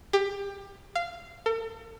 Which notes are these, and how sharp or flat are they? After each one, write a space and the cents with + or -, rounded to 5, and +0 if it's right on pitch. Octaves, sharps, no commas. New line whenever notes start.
G4 +20
F5 -15
A4 +45